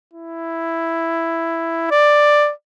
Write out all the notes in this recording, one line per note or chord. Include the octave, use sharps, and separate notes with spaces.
E4
D5